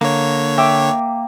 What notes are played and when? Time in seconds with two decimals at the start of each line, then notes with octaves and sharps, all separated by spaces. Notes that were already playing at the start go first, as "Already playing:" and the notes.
0.01 D3 A#3 C#5
0.58 E5 G5 D6